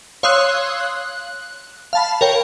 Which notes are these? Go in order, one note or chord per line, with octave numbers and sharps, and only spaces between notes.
C#5 F5 C6 D#6 E6 F#6
F#6
F5 A5 B5
A#4 C#5 G5